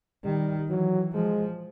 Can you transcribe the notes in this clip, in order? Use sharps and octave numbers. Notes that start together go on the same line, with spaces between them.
D#3 G3
E3 F#3
F3 G#3